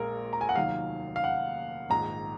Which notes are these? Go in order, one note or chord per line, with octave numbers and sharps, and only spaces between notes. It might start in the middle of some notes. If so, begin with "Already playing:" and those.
Already playing: A#1 A#2 G#3 A#4
A#5
G#5
F#5
F1 D#2 D#3 F#3 F5
F5
F#5
A#1 G#2 D#3 A#5